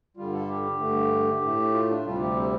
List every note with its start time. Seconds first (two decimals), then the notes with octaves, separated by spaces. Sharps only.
0.17 G2 D3 G3 F4
0.33 A4
0.49 G4
0.80 G2 D3 A3
1.42 A2 A3
1.73 F4
1.90 D4
2.05 D2 C3 G3 F4
2.21 G4
2.36 C4